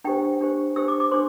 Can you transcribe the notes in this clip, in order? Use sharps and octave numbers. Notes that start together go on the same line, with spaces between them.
D4 G4 C5 G5
D4 G4 C5
D4 G4 C5 E6
D6
D6
D4 G4 C5 C6